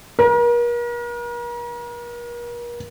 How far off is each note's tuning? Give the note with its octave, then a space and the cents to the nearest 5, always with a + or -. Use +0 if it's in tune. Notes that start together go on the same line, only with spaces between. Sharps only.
A#4 +40